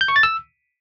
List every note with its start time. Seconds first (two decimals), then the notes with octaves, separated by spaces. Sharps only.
0.01 G6
0.08 C#6
0.16 A6
0.23 E6